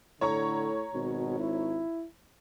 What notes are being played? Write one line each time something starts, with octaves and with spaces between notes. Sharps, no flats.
A2 D3 C#5 A#5 C#6
G#1 B2
E4